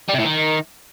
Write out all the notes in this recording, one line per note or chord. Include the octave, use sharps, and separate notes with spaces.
G3
C3
A2
D#3